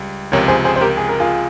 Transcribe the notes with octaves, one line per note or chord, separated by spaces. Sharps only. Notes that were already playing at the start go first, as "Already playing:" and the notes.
Already playing: C#2 G3
C#2 C3 F3 A#4 C#5
G#4 C5
G#4 C5
C5
G4 A#4
G#4
A#4
F4 G#4